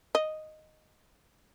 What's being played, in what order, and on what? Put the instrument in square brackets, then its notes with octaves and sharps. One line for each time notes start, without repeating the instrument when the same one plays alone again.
[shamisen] D#5